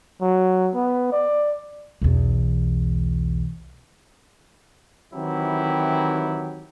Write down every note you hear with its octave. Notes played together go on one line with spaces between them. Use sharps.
F#3
B3
D5
B1 E2
D#3 E3 F#3 C4 E4 G4